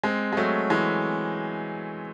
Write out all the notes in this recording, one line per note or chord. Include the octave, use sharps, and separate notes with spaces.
G#3 C4
G#3
F#3 A3
E3 G#3